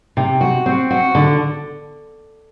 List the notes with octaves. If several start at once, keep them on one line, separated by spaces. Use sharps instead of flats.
C3
F#4
C4
F#4
D3